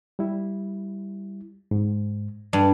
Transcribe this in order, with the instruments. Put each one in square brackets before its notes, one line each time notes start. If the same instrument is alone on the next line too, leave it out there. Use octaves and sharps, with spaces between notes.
[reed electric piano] G3 E4
G#2
[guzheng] G2 [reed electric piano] D5 A5